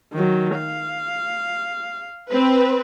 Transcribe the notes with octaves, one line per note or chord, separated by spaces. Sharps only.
D#3 F#3
F5
C4 B4